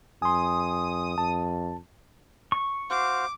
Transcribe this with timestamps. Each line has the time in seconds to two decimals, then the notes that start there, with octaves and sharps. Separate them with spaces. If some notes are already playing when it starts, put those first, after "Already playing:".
0.22 F2 G#5 C6 D#6
1.18 F2 A5
2.52 C#6
2.90 F#4 C5 F5 D6